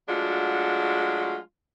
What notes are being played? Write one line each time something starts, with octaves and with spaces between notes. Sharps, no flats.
F#3 G#3 A3 D4 F4 F#4